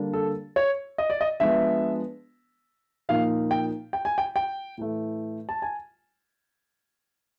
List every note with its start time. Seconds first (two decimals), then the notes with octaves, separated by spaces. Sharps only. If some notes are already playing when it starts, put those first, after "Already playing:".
Already playing: D3 G3 A#3 D4
0.13 A4
0.56 C#5
0.98 D#5
1.10 D5
1.21 D#5
1.40 F3 G#3 B3 D4 E5
3.09 A#2 F3 A#3 D#4 F5
3.51 G5
3.93 G5
4.05 G#5
4.18 G5
4.36 G5
4.78 A2 E3 A3
5.49 A5
5.62 G#5